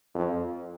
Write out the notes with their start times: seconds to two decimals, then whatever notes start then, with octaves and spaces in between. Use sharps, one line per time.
0.15 F2